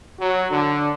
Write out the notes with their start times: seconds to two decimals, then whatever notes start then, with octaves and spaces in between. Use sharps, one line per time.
0.19 F#3
0.50 D3